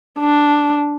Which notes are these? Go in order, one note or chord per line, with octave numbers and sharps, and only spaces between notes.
D4